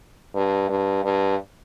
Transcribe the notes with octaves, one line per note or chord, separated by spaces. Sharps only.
G2
G2
G2